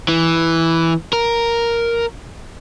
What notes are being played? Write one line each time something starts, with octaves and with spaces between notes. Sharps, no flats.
E3
A#4